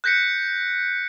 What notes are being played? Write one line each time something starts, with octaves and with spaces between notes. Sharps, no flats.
F#6 G6 A#6 B6 C#7